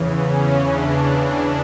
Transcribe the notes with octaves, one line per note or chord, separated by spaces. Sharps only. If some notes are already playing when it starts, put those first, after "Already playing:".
Already playing: E2 C#3 E3
C#4
E2 C#3 E3 D4